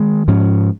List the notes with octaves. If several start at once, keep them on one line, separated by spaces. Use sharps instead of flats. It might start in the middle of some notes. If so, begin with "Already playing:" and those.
Already playing: D#3 G#3
G#2 F3 C#4